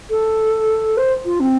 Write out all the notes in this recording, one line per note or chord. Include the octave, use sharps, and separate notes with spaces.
A4
C5
F4
C4